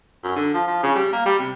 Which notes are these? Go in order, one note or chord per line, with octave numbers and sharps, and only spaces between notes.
F#2
D3
F3
F3
C#3
G3
A#3
G3
C3